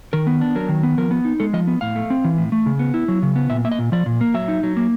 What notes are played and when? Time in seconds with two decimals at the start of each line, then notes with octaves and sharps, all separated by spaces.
0.13 D#3 A#4
0.27 B3
0.41 D4
0.55 F#3 A#4
0.69 D#3
0.83 B3
0.98 F3 A#4
1.11 B3
1.25 D#4
1.40 G#3 A4
1.53 F3 D#5
1.67 B3
1.81 A2 F5
1.96 A3
2.10 C4
2.24 E3
2.38 A2
2.52 A3
2.66 C#3
2.79 B3
2.94 E4
3.08 F#3
3.23 C#3
3.36 B3
3.50 A#2 E5
3.65 A#3 E5
3.71 D#5
3.79 A#2
3.92 F3 D5
4.06 A#2
4.21 A#3
4.34 F#3 E5
4.48 D#4
4.63 F#3
4.77 A#3